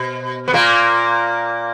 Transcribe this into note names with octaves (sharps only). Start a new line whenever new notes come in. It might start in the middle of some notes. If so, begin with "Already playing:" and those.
Already playing: B2
B3
A#2 A#3